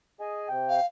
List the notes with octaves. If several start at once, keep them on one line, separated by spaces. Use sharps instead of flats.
G#4 D#5 G#5
C3 G5
F5